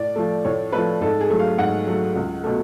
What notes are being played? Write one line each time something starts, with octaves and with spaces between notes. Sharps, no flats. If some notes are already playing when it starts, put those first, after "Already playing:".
Already playing: A2 D5
F3 A3
A2 C#5
F3 A3 B4
G#2 A4
G#4
F#3 A3
F5
G#2 F#5
F#3 A3
C#2
B2 A3